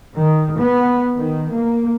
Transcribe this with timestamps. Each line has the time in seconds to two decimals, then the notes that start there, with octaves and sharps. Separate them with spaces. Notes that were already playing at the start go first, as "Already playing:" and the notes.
0.18 D#3
0.59 B3
1.18 D#3
1.54 A#3